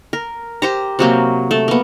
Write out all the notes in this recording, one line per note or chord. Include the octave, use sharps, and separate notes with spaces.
A#4
G4 C5 A#5
C3 F#3 A#3 G5
A3
A#3 B3